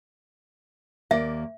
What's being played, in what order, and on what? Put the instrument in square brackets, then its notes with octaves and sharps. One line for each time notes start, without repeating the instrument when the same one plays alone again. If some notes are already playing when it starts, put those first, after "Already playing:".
[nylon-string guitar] D#2 A#3 D5 [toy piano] E5